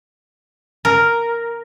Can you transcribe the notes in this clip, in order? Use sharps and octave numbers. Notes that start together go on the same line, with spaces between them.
A#4